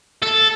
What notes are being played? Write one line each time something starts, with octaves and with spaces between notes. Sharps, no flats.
A4